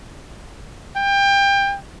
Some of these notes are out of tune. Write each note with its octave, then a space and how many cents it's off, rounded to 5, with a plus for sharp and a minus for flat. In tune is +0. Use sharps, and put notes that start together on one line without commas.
G5 +25